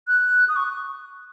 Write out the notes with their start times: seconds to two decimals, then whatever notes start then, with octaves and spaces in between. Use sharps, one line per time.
0.08 F#6
0.49 D#6
0.56 C#6